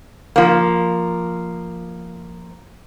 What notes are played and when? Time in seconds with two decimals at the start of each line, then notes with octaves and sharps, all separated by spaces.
0.36 F3 A#3